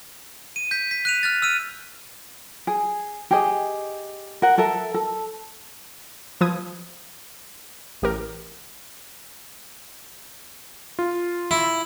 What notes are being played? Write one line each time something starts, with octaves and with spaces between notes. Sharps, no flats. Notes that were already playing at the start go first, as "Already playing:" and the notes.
D#7
G6 B6
B6
F#6 D#7 F7
F6 F#6 A6
E6 F6 D#7
G#4
G4 G#4 D#5
A#4 F#5
A4 A#4 E5
A4
F3 B4 D#6 G#6
A1 G4 A#4
F4
E4